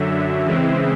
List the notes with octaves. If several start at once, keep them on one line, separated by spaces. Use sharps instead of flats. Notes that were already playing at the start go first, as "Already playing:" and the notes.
Already playing: F#2 D3 F#3 E5
C#3 E3 G#3 C4 E5